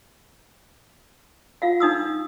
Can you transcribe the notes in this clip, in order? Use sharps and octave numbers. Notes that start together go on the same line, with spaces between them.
F4 F5 F#5
D4 D#4 D#6 E6